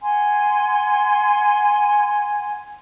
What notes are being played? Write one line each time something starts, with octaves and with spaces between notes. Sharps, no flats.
F#5 G#5 C6